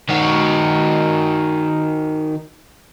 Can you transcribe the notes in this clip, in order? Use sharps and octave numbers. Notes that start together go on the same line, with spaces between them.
D#3 F#4